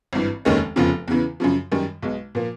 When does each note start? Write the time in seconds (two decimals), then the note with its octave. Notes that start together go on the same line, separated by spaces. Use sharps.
0.13 G#1 G2 E3
0.45 F1 D#2 D#3 G#3 C#4
0.76 F1 E2 C#3 F3
1.08 E2 C#3 E3
1.40 F#2 C#3 F3
1.72 F#2 D#3 G3
2.02 B1 B2 G#3
2.35 A#2 F3 A#3